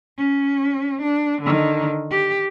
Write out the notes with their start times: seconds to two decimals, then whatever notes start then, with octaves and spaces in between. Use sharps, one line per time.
0.18 C#4
1.02 D4
1.42 D3 D#3
2.11 G4